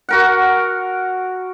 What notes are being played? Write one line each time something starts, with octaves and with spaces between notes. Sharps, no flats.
F#4 A#4 F#5